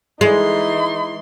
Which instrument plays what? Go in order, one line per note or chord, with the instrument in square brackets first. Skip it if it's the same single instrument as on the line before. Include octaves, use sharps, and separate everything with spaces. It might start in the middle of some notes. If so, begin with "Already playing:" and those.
[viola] E3 C6 [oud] G#3 [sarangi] D#4